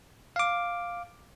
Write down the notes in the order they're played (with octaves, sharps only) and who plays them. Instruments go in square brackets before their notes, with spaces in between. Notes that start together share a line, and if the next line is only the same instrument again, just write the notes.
[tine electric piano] F5 D6